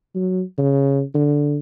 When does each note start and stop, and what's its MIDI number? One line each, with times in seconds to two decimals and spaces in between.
0.16 0.42 54
0.58 1.03 49
1.15 1.59 50